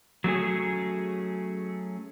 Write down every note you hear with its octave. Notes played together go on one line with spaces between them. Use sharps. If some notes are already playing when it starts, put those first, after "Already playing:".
F#3 A3 C#4 G#4